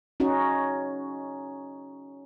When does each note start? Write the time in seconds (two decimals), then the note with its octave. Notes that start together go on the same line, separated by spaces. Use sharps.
0.20 C#4 D#4 F#4